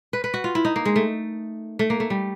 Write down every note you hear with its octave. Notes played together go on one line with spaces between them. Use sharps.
B4
B4
F#4
F4
E4
D#4
A#3
G#3
A3
A3
A#3
A3
G3